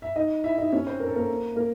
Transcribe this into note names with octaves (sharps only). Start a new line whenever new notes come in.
E5
D#4 D#5
E4 E5
D#4 D#5
C#4 C#5
C4 C5
A#4
A4
A#3 A#4
A#3 A#4